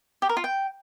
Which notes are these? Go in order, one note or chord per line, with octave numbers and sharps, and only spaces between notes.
G4
A#4
F4
G5